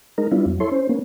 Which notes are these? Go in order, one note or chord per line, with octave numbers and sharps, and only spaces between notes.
G#3 D#4 A#4
G3 B3 D4 E4 F4
F2 F#3
E4 A4 C#5 C6
C#4 C5
A#3 B3 C#4